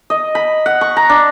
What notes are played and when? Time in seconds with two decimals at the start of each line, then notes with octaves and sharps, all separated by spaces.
0.10 D#5
0.35 B5
0.66 F#5
0.81 C#6
0.97 A#5
1.09 D4